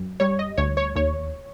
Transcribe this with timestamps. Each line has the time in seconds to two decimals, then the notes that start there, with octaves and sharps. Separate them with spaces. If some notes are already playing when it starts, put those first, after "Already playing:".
Already playing: F#2
0.20 G3 C#5
0.39 D#5
0.57 D2 C#5
0.77 C#5
0.96 D#2 C#5